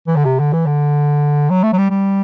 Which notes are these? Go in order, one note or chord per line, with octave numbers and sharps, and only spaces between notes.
E3
D3
C3
D3
E3
D3
F#3
A3
F#3
G3
G3